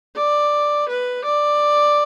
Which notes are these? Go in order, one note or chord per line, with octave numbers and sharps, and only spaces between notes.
D5
B4
D5